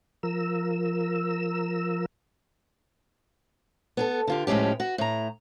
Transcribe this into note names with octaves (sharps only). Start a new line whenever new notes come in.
F3 A#4 E6
B3 G#4 A4
D3 F4 G4
A2 F3 G#3 C#4 G4
F#4
A2 A#5